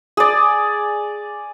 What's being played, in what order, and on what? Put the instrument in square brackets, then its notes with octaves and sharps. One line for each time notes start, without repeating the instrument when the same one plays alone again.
[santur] G#4 D5